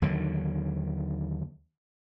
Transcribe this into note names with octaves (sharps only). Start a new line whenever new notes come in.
D#2 D3 D#3 F#3